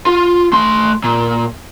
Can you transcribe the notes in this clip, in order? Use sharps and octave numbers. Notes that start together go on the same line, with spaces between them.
F4
A3 C6
A#2